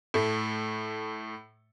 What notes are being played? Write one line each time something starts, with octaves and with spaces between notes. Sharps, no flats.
A2 A3